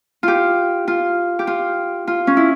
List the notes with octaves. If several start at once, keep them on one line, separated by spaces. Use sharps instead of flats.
F4 G4
F4
G4
F4
F4
C#4
E4